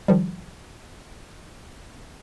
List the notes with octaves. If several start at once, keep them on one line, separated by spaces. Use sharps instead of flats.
D#3 F3 G3